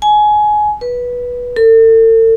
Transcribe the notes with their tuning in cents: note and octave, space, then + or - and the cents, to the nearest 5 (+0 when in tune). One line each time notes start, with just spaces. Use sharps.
G#5 +20
B4 -15
A4 +40